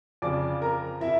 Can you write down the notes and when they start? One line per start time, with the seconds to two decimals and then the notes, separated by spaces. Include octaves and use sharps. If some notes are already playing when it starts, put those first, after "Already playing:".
0.22 F2 C#3 F3 D5 D6
0.62 A#4 A#5
1.01 E4 E5